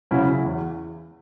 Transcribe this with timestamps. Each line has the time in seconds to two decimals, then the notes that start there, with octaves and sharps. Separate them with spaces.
0.11 C#3 F#3 C#4 E4
0.45 E2